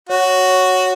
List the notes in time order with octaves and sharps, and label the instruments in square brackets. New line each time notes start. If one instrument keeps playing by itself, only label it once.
[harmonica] F#4 [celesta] C#5
[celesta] C#5